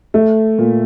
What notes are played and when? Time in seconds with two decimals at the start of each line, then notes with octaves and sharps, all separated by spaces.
0.14 A3
0.59 A#2